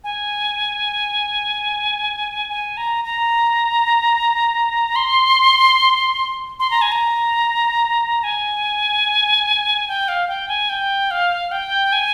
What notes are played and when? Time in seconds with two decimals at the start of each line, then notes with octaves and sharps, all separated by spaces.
0.04 G#5
2.49 G#5
2.77 A#5
3.05 A#5
4.96 C6
6.60 C6
6.71 A#5
6.82 G#5
6.92 A#5
8.24 G#5
9.88 G5
10.08 F5
10.28 G5
10.49 G#5
10.69 G5
11.11 F5
11.51 G5
11.92 G#5